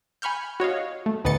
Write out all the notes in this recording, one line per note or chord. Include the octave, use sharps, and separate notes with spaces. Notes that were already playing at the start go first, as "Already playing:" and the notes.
G#5 B5 C#6 F6 G6
F#4 C#5 D#5 F5
A3
A1 D2 B3 D#5 A6 C#7